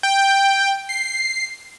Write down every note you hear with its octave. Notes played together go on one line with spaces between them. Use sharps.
G5
C7